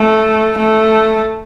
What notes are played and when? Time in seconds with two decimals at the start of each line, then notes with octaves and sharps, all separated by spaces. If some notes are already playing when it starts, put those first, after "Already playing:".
Already playing: A3
0.58 A3